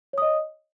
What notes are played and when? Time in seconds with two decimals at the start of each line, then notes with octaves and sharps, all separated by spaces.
0.13 C#5
0.18 D#6
0.22 D#5